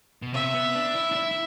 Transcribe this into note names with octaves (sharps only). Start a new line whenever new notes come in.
B2
C3 E5
B3
D4
E4
D4
E4
E4